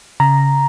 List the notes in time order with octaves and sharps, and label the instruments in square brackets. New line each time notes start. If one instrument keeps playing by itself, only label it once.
[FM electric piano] C#3 A#5